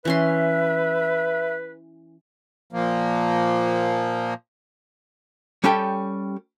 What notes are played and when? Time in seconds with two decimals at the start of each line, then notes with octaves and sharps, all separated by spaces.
0.05 E3 C#4 B4 E5 C6
2.73 A#2 F3 A#3
5.64 G3 C#4 G4 A4 G5